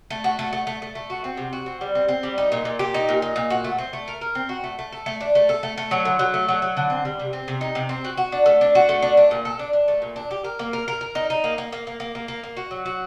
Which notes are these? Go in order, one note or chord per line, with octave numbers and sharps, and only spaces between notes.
A3
F#4
A3
A3
A3
A3
A3
F#4
C4
C3
F#4
C4
G3
C4
C4
G3
D#4
A#2
A#2
G4
D#4
A#2
D#4
A#2
F#4
A3
C4
A3
A#4
A#4
C4
F#4
A3
A3
A4
A3
D4
A3
A4
A3
A3
F#3
D3
F#3
A3
F#3
F#3
D3
C4
G3
C3
C4
C3
D#4
C3
C4
F#4
F#4
D4
A3
D4
F#4
A3
D4
D4
A#2
A4
D4
D4
A3
A#2
D4
G4
A#4
A#3
A#4
A#4
A#4
D#4
D#4
A#3
A#3
A#3
A#3
A#3
A#3
A#3
A#3
F#4
F#3
F#4